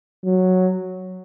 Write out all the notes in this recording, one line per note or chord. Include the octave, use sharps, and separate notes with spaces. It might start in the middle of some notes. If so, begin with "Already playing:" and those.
F#3